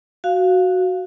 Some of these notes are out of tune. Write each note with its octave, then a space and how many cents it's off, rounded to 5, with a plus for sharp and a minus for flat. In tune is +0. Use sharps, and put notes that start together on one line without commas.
F#4 +0 F5 +0